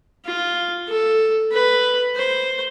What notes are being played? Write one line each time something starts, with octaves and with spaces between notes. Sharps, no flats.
F4
A4
B4
C5